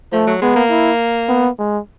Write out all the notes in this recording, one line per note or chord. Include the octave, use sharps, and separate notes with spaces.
F3 A3
F#3
G#3 B3
A#3
E4
B3
G#3